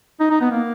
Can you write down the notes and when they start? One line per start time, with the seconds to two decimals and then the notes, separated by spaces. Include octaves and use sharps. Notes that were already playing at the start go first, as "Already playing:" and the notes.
0.20 D#4
0.30 D#4
0.41 B3
0.51 A#3